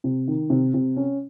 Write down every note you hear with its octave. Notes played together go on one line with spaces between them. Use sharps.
C3
D#3
C3
C3
C#4